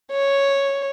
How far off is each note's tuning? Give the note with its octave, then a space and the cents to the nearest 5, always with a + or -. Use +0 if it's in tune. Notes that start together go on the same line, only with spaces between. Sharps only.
C#5 -5